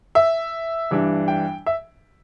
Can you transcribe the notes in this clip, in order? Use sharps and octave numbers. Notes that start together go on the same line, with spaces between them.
E5
G2 E3 G3 D4
G5
E5